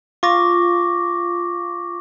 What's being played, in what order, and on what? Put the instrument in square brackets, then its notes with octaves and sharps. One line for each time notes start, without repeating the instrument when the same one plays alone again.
[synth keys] F4 [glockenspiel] C#6 D6 A#6